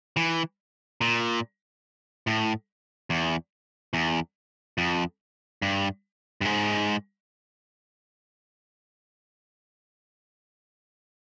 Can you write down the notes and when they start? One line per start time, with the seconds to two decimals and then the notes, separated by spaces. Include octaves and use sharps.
0.17 E3
1.01 A#2
2.27 A2
3.10 E2
3.94 E2
4.78 F2
5.62 G2
6.41 G2
6.45 G#2